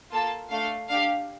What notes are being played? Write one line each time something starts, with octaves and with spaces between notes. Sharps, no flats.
A#3 F4 A4 A5
A3 D4 A4 F5
D4 G4 F5